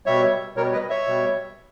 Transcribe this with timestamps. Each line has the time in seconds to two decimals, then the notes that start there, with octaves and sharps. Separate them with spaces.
0.06 B2 G3 C#5 E5
0.56 B2 G3 A#4 C#5
0.73 B4 D#5
0.90 C#5 E5
1.07 B2 G3